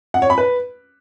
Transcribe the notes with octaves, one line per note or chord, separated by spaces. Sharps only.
F#5
C#5
B5
B4